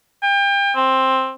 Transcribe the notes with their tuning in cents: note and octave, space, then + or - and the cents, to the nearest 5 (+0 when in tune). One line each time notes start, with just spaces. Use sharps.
G5 +35
C4 +10